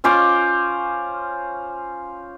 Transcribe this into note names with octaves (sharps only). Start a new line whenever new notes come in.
C#4 F4 C5 D6